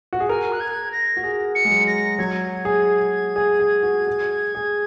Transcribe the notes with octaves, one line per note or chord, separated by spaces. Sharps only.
F#4
G#4
A#4 G#5
F#6
G#6
A#6
F#4
G#4
C#7
G#3
F#3
A#6
F#3 G#6
G#4
G#4
G#4
F#4
G#4
G#4